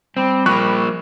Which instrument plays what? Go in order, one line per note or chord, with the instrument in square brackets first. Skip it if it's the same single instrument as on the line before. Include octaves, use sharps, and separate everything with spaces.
[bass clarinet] G3 [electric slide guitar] C4
[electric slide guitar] F3 A#3 [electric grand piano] B5 C#6 F#6